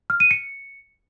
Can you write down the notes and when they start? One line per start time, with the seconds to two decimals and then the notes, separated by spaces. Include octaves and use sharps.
0.10 F6
0.20 D#7
0.31 C#7